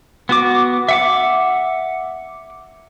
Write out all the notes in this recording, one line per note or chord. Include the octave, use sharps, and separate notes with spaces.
B3 F#4 D6
E5 F#5 D6